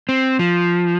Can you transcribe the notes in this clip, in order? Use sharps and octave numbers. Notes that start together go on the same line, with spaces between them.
C4
F3